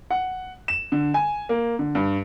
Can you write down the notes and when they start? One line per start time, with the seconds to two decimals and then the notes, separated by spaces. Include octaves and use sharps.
0.11 F#5
0.68 E7
0.92 D3
1.14 G#5
1.49 A#3
1.79 D3
1.95 G2